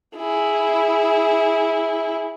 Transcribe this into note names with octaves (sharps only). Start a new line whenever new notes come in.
E4 G#4